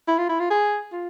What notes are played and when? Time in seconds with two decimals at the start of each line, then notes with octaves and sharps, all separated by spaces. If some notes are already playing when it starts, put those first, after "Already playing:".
0.08 E4
0.18 F4
0.29 E4
0.40 F4
0.50 G#4
0.92 F4